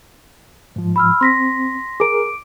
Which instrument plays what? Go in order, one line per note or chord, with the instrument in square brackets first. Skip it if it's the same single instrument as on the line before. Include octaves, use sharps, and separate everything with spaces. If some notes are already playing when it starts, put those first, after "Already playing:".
[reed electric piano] G#2 F3
[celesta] B5 E6 F6
[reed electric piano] C4 [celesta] C6 A#6 B6
[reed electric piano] G#4 A#4 [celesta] D6 D7